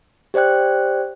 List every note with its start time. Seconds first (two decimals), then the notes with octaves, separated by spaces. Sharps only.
0.34 G4 C5 D5 G5 F#6